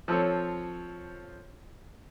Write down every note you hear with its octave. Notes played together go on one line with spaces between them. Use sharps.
F3 C4 A4 C#5